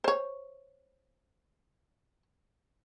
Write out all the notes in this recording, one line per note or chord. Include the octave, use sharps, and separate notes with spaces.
C5 C#5